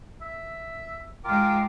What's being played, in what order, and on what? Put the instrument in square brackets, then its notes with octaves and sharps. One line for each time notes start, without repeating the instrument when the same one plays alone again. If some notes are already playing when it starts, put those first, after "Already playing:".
[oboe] E5
[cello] G#2 G#3 [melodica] F4 A#4 [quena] G5 [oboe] D6